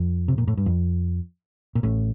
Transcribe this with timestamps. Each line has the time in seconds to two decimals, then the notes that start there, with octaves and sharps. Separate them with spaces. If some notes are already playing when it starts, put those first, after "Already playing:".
Already playing: F2
0.28 C3
0.38 A#2
0.48 A2
0.57 G2
0.66 F2
1.75 A#2
1.83 A1 A2